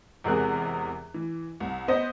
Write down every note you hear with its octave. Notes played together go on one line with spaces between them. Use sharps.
E2 C3 G#3 G#4 A#4 F#6
E3
C2
B3 C5 D#5 G6